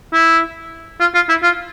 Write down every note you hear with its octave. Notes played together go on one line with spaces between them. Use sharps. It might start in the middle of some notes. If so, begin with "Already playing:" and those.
E4
F4
F4
E4
F4